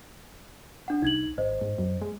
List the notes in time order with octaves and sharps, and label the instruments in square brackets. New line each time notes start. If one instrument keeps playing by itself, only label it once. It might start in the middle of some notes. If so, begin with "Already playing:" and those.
[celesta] D4 F#5
[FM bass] C2 [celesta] D#4 G#6 F#7
[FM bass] G#1 [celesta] C5 D#5
[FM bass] G#2
F#2
G#3